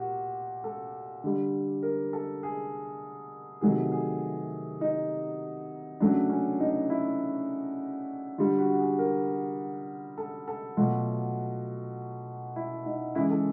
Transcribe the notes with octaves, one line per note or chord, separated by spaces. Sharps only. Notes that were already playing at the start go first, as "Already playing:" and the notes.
Already playing: A#2 F#4 G4
A4
D3 G3
A#4
A4
G#4
C3 D#3 F#3 A3 G#4
G#4
D#4
C#3 F#3 A3 D4
C#4
D#4
E4
D3 G3 F4
F#4
G#4
A#4
A4
A4
B2 F#3 A3 F4
E4
D#4
C#3 E3 G#3 E4
A4